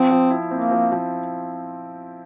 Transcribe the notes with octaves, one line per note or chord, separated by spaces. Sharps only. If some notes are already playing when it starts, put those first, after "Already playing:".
Already playing: F3 C4
F3
E4
A#3 C4
F3
F3